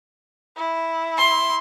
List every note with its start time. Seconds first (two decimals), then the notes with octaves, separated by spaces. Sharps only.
0.57 E4
1.18 C6